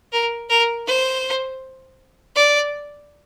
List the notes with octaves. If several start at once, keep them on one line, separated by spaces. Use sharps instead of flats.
A#4
A#4
C5
D5